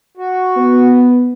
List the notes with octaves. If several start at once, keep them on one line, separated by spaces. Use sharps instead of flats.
F#4
B3